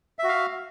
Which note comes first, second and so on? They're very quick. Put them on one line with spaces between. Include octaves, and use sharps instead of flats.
E5 F#4 F5